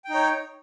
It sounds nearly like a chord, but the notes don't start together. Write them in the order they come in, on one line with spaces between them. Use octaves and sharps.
G5 D#4 C#5